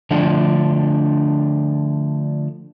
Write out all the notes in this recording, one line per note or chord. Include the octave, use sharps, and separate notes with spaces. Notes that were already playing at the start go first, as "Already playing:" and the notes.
D3 F3 A3 D4